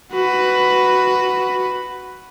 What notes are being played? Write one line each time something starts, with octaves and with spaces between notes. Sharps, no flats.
F#4 B4